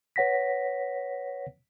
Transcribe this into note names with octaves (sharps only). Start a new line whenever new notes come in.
B4 C#5 F#5 A#6 B6